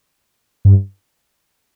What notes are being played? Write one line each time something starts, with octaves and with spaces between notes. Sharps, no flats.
G2